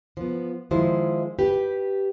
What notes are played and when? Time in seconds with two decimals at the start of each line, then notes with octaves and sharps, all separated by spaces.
0.17 F3 B3
0.71 D#3 F3 G#3 E4 C5
1.39 G4 B4